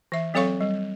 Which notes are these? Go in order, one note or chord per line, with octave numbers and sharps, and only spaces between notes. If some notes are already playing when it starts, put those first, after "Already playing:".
E3 E5
F#3 C4 A4 C#5 F5 C#6
G3